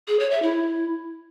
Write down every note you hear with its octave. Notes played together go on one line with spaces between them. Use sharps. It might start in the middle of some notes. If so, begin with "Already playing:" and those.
G#4
C#5
E5
E4